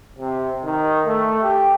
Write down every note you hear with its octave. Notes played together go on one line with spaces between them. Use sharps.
C3
D#3
A3
G4